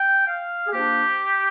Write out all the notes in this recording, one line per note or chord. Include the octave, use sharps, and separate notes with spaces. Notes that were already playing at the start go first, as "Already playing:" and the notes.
Already playing: G5
F5
G#4
F3 A#3 D4 G4